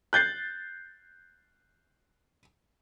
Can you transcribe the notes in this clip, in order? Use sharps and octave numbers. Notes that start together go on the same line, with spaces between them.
F#6 G6 A6 C7